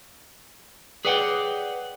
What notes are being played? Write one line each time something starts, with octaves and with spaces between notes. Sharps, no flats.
G#4 B4 C#5 D5 F#5 G5